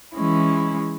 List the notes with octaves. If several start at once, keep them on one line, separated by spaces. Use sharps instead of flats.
E3 G#3 C#4 E4